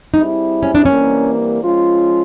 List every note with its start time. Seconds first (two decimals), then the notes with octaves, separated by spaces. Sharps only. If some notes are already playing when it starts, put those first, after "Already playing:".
0.14 G3 C4 D#4 E4 G#4
0.63 C#4
0.75 D4
0.85 C3 E3 G3 A#3 C#4
1.61 F3 G#3 C#4 F4